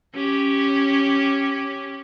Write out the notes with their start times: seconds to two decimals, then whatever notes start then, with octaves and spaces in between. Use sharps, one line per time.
0.15 C#4 G4